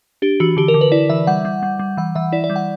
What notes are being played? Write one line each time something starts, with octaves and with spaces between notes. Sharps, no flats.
D4 G4
E3 F#4
D3 G4
A#4
D3
B4
E4 D5
E3 E5
G3 F#5
G3
G3
G3
E3 F#5
E3 E5
E4 D5
D5
G3
F#5